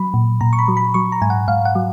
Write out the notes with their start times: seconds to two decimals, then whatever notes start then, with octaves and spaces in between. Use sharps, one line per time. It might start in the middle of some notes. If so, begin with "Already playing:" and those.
Already playing: F#3 B5
0.14 A#2
0.41 A#2 A#5
0.53 C#6
0.59 B5
0.68 F#3
0.77 B5
0.94 F#3 C#6
1.12 A#5
1.22 G#2 G#5
1.30 F#5
1.48 G#2 F5
1.65 F#5
1.75 F#3